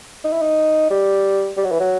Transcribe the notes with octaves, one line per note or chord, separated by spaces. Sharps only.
D#4
E4
D#4
G3
G3
F#3
E3
F#3